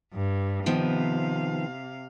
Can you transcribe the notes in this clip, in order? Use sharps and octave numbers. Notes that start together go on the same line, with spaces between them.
G2
C3 D#3 F3 B3 F5